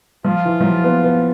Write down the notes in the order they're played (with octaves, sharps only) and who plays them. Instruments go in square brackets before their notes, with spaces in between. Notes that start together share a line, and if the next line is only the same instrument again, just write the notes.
[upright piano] F3 [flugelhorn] F4
[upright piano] E3
F3
F#3
B3
B3